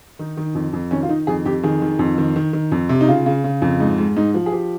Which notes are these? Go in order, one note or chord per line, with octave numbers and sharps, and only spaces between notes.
D#3 D#4
D#3
F2
F2
D#3 C#4
F4
D#3 D#4
F2 G#4
F2 G4
D#3 G#4
D#3
F2
D#3
D#3
D#3
F2
C3
D#4
C#3 F4
C#3
C#3
F2
G#2 D#4
G#2
G#2 D#4
F3
G#4
F3 G4